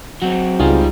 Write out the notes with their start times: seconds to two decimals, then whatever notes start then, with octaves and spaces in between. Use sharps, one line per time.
0.22 F#3 C4 F#4
0.59 C#2 G3 D#4 F4 G#4